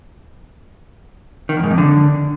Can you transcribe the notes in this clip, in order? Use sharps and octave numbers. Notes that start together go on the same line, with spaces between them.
D#3
E2
G#2
F2
D3